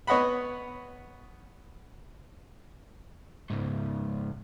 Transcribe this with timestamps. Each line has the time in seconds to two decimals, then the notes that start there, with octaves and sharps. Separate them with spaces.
0.07 B3 C#5 D#5 F#5 B5
3.50 C#2 G#2